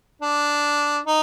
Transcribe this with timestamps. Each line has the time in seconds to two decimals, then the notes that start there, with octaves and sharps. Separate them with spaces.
0.22 D4
1.07 D#4